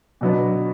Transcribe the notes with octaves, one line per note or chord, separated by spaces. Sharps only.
B2 F#3 B3 D4